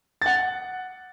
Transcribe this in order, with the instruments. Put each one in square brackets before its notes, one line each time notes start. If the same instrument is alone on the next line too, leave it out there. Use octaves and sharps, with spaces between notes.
[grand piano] F#5 A6